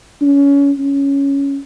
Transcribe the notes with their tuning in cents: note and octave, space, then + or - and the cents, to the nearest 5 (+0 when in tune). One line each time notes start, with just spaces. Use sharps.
C#4 +25
C#4 +5